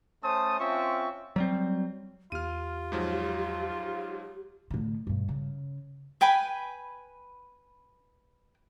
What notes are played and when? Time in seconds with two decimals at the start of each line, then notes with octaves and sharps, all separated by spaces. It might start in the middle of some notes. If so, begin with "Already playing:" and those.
0.24 A3 C#4 C5 A5 D#6
0.59 C4 C#4 F4 E5 C#6
1.36 F#3 G3 C4
2.32 E2 F4 G4 F6 D#7
2.92 G#2 F3 F#3
4.70 A2 D3
5.07 G2 B2
5.29 C#3
6.21 B4 G5 G#5 B5